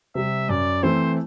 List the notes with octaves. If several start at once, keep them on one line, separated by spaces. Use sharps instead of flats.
C3 G3 E5
F#2 D5
E3 A3 C4 E4 C5